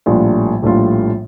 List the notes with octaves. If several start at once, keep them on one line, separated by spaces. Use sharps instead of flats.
A#1 A2 G3 D4 F4
A#1 A2 G3 D4 F4